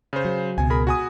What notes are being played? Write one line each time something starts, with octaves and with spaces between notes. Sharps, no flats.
C#3 C5
F#3
C#2 B2 G#5
G#4 A#4 B5
F#4 G#5 D#6